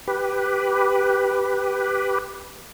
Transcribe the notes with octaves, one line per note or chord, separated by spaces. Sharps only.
G4 B4